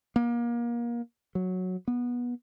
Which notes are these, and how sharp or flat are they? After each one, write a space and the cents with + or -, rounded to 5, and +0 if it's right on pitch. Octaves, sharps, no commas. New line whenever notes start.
A#3 +30
F#3 -5
B3 -20